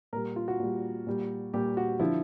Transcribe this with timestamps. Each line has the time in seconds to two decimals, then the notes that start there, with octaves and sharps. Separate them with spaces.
0.13 A#2 A#4
0.16 G3
0.36 F4
0.48 F#4
0.60 A#2 G3
1.07 A#2 G3
1.53 A#2 G3 G4
1.77 F#4
2.00 D3 F3 E4